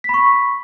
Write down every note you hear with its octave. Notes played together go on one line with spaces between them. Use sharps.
B5 C#6 B6